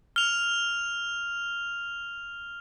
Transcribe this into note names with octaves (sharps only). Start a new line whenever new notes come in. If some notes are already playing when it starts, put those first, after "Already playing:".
F6 F7